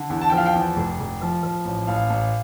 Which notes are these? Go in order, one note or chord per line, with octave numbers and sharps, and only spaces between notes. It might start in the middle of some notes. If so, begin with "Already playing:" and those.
Already playing: D3
E2
A5
F3 G5
F5
G5
E2
F1
F1
F3
F3
A1
A1 F5
A1